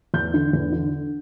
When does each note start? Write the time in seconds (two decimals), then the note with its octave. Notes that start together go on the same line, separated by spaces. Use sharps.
0.14 E2 G6
0.34 D3
0.53 E2
0.72 D3